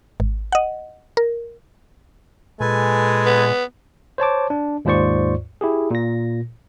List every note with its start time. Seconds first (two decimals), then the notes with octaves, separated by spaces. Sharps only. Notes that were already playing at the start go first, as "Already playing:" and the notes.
0.20 G#1
0.52 D#5 F#5
1.17 A#4
2.60 A#2 G#3 A4 B4 G#5
3.26 B3
4.18 C5 C#5 A5 D6
4.50 D4
4.85 D#2 G#2 F4 C5 D5 C#6
5.61 E4 G4 G#4
5.91 A#2 A#6